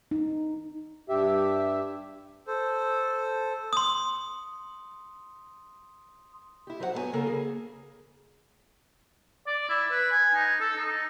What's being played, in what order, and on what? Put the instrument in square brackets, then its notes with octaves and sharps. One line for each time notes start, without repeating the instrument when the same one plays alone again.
[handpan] D#4
[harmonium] G2 G4 E5
[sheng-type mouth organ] A4 C5
[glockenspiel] C6 D#6
[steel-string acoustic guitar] E4 G4
F#3 C5 C#5 F#5
G2 F#3 B3 A4 C#5 G#5
C#3 A#3 A4 A#4
G#4
[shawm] D5
E4
B4
G#5
D#4
A4
D#4